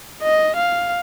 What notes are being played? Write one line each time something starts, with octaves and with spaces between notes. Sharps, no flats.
D#5
F5